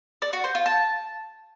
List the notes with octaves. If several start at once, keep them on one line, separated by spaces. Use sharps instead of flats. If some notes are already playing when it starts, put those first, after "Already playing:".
D5
F#4
C5
F4
A5